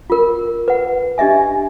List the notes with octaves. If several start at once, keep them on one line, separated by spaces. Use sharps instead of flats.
F4 A#4
B4 F#5
D4 G4 D#5 E5 G#5